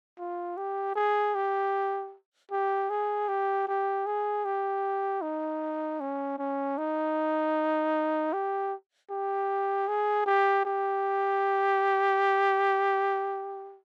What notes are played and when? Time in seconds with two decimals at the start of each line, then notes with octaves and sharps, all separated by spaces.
0.18 F4
0.57 G4
0.95 G#4
1.35 G4
2.51 G4
2.90 G#4
3.28 G4
3.68 G4
4.06 G#4
4.45 G4
5.22 D#4
6.00 C#4
6.38 C#4
6.78 D#4
8.33 G4
9.10 G4
9.88 G#4
10.26 G4
10.65 G4